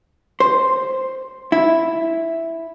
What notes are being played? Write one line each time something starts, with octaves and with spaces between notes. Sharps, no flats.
C5
E4